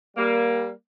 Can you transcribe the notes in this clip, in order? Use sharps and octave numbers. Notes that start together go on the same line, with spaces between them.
G3 A#3